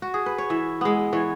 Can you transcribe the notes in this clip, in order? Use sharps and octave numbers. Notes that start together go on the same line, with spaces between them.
F#4
G#4
B4
C#5
E3 E5
G#3 B3
E3 C#5